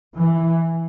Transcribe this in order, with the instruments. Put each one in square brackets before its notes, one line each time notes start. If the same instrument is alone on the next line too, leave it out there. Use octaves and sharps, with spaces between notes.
[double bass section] E3